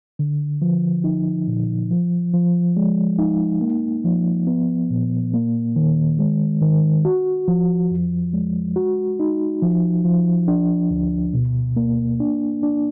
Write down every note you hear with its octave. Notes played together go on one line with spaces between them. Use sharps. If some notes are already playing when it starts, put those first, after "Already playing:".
D3
F3
D#4
A#2
F3
F3
G#3
D#4
A#3
F3
B3
A#2
A#3
D#3
G#3
D#3
F#4
F3
F2
G#3
F#4
D#4
F3
F3
D4
D2
B2
A#3
D4
D4